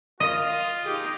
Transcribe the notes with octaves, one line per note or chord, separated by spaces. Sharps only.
F4 D#5
D#4 G4 G#4